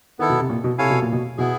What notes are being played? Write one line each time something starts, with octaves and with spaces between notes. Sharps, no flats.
D#3 B3 E4 A4
B2
C3
A#2
B2
C3 E4 A4 C#5 F5 G#5
B2
A#2
B2
B2 B3 E4 G#4